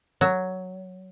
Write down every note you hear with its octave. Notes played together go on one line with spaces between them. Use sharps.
F#3